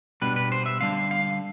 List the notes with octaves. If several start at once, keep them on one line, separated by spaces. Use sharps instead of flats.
B2 G3 D4 B4
B4
C5
E5
D3 G3 D4 F5
F5